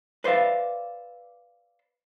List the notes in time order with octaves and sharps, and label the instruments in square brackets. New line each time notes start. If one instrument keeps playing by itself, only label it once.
[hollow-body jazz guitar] B4 C5 D5 E5 F5